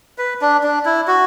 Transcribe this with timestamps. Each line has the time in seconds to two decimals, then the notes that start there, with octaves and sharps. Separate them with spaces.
0.18 B4
0.42 D4
0.63 D4
0.85 E4
1.08 F#4